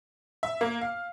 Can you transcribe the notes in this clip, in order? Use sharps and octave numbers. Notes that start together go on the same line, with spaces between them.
E5
A#3
F5